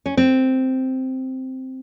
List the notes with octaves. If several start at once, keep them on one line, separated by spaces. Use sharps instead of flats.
C#4
C4